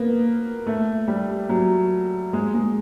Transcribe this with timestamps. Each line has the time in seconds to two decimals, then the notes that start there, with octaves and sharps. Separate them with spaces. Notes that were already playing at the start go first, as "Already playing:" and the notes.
Already playing: A#3 B3
0.67 A3
1.08 G3
1.49 F#3
2.33 G#3
2.54 G#3